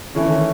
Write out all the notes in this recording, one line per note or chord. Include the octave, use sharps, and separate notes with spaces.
D3 E3 A3 C#4 E4
D#3